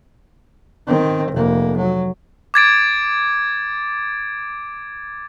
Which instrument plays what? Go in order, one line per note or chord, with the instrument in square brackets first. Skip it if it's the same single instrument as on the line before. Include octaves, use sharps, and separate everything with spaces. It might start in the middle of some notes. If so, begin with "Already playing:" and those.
[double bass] D#3 C4
F1 A#3
F#3
[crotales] D6 G#6 A6 D7